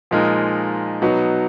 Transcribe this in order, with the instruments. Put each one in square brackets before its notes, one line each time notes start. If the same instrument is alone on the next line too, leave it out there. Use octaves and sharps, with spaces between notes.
[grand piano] A#2 F3 G#3 D#4 A#4
B2 F#3 B3 D#4 F#4